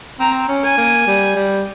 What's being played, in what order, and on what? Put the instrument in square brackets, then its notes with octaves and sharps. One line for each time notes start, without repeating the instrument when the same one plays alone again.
[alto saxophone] C4 [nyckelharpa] A#5
[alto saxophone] C#4
[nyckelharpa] G#5
[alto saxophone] A#3
G3
G3